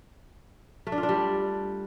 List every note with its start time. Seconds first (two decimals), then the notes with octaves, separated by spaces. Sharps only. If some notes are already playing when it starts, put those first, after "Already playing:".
0.87 A3
0.92 D4
0.98 F4
1.03 D4
1.09 G3